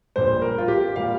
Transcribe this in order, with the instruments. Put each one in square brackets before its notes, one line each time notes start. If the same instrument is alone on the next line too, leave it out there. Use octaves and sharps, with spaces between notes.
[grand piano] A#1 A#2 G3 C5
A#4
F4
G4
A#2 G3 F5